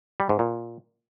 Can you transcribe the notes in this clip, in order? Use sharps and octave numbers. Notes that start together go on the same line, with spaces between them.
G3
G#2
A#2